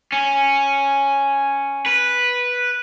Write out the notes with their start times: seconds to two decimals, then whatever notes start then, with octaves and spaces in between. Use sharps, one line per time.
0.12 C#4
1.86 B4